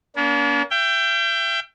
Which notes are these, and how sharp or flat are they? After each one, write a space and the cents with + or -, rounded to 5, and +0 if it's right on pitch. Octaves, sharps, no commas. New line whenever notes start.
A#3 +30 D4 -45
E5 +40 G5 +0